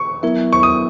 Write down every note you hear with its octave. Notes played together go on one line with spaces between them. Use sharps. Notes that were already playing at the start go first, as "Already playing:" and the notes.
Already playing: C#6
F#3 B3 E4 A#4 E5
C#6
D#6